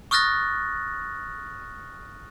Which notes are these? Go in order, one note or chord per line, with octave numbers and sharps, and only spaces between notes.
C#6 D#6 F6 F#6 A6 A#6